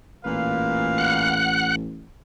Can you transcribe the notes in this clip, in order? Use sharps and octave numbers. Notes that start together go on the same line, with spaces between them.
A1 A#2 B4 F5
F#5 F#6